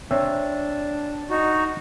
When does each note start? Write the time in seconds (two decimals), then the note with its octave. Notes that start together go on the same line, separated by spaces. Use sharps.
0.11 C4 D4 C#5 E5
1.30 D#4 F#4